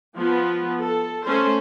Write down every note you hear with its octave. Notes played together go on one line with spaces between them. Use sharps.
F3 B3
A4
A3 C#4 C5